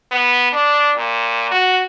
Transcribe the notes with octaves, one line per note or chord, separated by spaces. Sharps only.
B3
D4
A#2
F#4